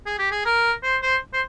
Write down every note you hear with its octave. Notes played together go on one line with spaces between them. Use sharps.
G#4
G4
G#4
A#4
C5
C5
C5